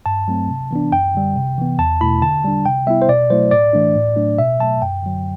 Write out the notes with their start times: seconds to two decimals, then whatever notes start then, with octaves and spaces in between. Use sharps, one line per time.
0.06 G2 A5
0.28 F#3 A3 C4
0.50 C3
0.71 E3 B3 D4
0.92 F#2 G5
1.15 D3 G3
1.36 C3
1.58 E3 B3
1.79 E2 A5
2.01 B2 A3 E4 B5
2.22 D3 A5
2.44 G3 D4
2.66 C3 G5
2.87 G3 B3 E4 E5
3.02 C5
3.09 B2 D5
3.30 F#3 A3 E4 C5
3.51 A2 D5
3.73 E3 A3 D4
3.96 A2
4.16 F#3 A3 D4
4.38 B2 E5
4.59 F#3 A3 A5
4.82 F#2 G5
5.03 D3 F#3